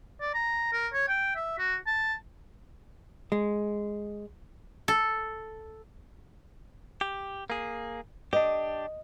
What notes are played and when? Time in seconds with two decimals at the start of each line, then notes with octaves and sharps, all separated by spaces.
0.20 D5
0.34 A#5
0.73 A#4
0.93 C#5
1.08 G5
1.36 E5
1.58 F#4
1.87 A5
3.32 G#3
4.88 A4
7.01 G4
7.50 A#3 G#4
8.33 D4 G4 D#5